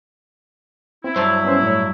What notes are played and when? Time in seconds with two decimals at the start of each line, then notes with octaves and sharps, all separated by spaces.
1.04 C4 E4
1.16 G2 F#3 C5 A5
1.44 B3 C#4 C5
1.62 A2 C#5